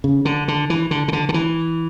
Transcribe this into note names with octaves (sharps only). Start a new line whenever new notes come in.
C#3
D3
D3
E3
D3
C#3
D3
D3
E3